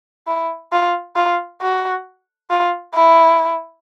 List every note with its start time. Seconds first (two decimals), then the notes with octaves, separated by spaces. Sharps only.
0.27 E4
0.72 F4
1.16 F4
1.62 F#4
2.50 F4
2.95 E4